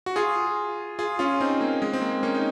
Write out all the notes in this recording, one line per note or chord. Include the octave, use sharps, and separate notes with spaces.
F#4
F4 G#4
F4 G#4
C#4 F4
C4 D#4
A#3
G#3
C4
A#3
A#3 C#4
D#4